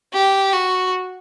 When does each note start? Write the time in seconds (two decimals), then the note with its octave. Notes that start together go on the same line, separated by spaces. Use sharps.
0.13 G4
0.53 F#4